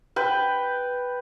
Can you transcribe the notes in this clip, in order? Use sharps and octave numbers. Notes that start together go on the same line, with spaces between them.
B4 G5